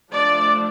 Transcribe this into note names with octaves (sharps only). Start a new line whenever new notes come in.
F3 A3 D4 D5